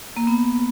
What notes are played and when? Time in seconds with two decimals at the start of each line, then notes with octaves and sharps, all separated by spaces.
0.17 A#3
0.27 B3